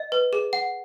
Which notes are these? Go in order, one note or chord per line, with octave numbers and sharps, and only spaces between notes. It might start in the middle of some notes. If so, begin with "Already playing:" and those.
Already playing: D#5
B4
G#4
F#5